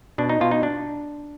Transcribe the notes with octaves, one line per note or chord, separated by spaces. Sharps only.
B2 D4
D#4
B2 F4
D#4
D4